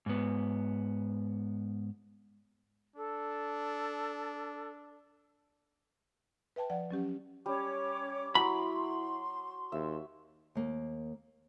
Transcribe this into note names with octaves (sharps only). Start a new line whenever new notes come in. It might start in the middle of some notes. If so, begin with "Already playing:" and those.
G#2 B3
D4 A4
B4 E5 G5 A5
F3 D5 F#5
F#3 C#4 G4
G3 C#4 C#5 D6
F#3 E4 B5 C6 D6
D#2 E5
D#2 A#3